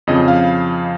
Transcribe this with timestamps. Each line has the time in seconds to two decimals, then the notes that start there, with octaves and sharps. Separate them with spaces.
0.07 F2 C#3 F3 D#5
0.28 F5